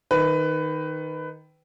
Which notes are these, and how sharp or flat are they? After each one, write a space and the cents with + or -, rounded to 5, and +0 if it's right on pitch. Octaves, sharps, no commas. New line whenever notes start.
D#3 +0 B4 +20